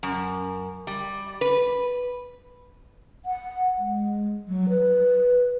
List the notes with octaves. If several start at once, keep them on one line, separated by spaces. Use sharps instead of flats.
F#2
G3
B4
F#5
G#3
F#3
B4